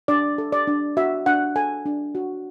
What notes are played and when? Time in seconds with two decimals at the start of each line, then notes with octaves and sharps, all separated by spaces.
0.08 D4 D5
0.38 A4
0.52 D5
0.67 D4
0.97 F#4 E5
1.26 D4 F#5
1.56 A4 G#5
1.86 D4
2.15 F#4